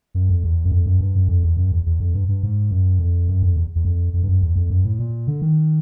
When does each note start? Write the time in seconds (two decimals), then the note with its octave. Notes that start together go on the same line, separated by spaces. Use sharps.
0.14 F#2
0.29 F2
0.44 E2
0.65 F#2
0.72 F2
0.86 F#2
1.01 G2
1.15 F#2
1.28 F2
1.43 E2
1.57 F#2
1.72 E2
1.86 E2
2.00 F2
2.14 G2
2.29 G2
2.43 G#2
2.71 F#2
2.99 F2
3.28 F#2
3.43 F2
3.57 E2
3.75 E2
3.85 F2
4.13 F2
4.23 G2
4.28 F#2
4.42 E2
4.56 F2
4.70 F#2
4.84 A2
4.99 A#2
5.27 D3
5.42 D#3